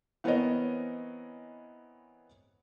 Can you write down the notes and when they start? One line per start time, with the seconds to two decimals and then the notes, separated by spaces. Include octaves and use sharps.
0.24 E3 B3 C4 A#4 C#5 D#5